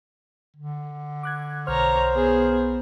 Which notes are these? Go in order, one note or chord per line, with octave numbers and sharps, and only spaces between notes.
D3
D6 F#6 G#6
B1 C5 C#5 A#5 F6
B3 G#4